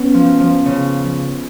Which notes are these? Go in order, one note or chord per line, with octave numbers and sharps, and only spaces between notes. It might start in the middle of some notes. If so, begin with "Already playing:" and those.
Already playing: B3 C#4
F3
F3
C#3